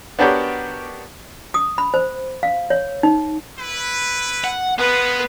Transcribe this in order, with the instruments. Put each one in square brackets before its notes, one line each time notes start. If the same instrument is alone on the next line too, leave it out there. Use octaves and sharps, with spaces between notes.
[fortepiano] B3 D4 F#4 G4 A#4 C#5
[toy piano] D#6
B5
C5
F5
C#5
D#4
[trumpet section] E4 B4
[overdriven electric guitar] F#5
[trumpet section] G#3 F4 G#4 [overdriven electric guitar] B3 [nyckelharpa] B4